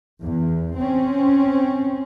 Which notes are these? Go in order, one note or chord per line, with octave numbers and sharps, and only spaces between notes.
E2
C4 C#4